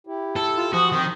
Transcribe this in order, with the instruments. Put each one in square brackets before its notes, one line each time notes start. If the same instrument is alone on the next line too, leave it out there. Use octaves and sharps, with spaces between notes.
[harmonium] E4 G4
[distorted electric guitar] A4
[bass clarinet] F4
[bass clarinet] F3 [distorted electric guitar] F#4 [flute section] D#6
[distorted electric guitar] D#3 [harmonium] C4